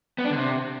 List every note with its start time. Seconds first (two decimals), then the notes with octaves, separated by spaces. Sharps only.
0.18 B3
0.25 D4
0.31 D3
0.37 C3